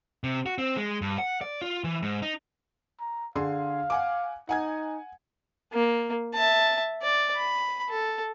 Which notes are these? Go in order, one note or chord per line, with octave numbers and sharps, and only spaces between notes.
C3
F#4
C4
G#3
G2
F#5
D5
F4
E3
G#2
D#4
A#5
D3 G#4 F5 C6
F#5 G#5 D6
D#4 F#5 G#5 G#6
A#3
E5 A5
D5
B5
A4